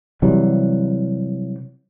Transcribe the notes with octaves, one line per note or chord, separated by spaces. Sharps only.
C3 E3 F#3 G3